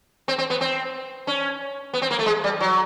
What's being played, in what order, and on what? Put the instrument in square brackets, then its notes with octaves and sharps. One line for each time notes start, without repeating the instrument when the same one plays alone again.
[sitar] C4
C4
B3
C4
C#4
B3
C4
A#3
A3
G#3
G3
F#3